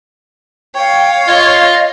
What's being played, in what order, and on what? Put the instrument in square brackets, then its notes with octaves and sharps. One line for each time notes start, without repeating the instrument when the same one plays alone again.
[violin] C#5 F5 [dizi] G5
[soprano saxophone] F4 [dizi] D#5